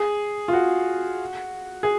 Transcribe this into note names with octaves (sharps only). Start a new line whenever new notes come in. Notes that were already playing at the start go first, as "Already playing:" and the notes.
Already playing: G#4
F4
F#4
G#4